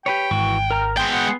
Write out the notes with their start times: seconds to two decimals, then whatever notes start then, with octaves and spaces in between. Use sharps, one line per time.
0.06 G4 B4 C#5 G5
0.31 G#1 E3 F#4 C#6
0.71 A#4 A#5 F6
0.97 G#3 B3 G#4 G5 C6
1.13 F#5